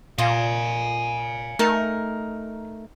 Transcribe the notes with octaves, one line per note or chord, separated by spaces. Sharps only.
A#2 F4 D#5 F5 G#5
A3 D#4 A#4